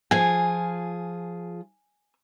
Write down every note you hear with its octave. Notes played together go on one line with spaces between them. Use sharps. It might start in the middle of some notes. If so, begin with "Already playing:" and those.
F3 F4 G#4 G#5